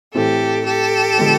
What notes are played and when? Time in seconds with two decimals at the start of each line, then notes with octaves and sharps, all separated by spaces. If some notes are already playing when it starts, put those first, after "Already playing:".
0.14 A2 E3 A3 C4 G4 A4
0.65 G4 A4
1.18 D3 F3 G#3 B3